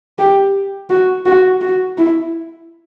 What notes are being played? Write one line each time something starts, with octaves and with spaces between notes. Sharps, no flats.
G4
F#4
F#4
F#4
E4